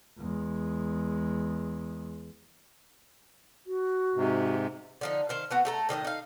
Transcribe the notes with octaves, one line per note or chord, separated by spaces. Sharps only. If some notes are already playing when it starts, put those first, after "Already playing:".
E2 G#3
F#4
G#2 C3
D3 F3 D#4
D#3 C5 F5
A3 B3 F#4
A3 A4 A#5
A2 D#3 G4 D#5
D#4 F5